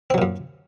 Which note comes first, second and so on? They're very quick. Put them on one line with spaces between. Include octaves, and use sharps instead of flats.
C4 F#3 A#2 F#2